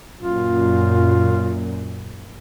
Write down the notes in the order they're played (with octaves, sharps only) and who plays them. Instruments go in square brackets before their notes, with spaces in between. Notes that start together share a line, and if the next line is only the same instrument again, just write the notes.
[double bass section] F#2 A#2 [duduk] F4